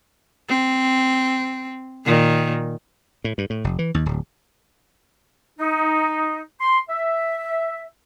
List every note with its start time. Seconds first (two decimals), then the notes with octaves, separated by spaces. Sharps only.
0.49 C4
2.05 A#2 D#3
3.24 A2
3.38 G2
3.50 A2
3.64 F1
3.79 E3
3.94 D#2
4.06 D1
5.59 D#4
6.61 C6
6.89 E5